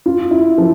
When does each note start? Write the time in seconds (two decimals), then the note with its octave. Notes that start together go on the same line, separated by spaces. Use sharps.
0.06 F4
0.31 E4
0.58 F3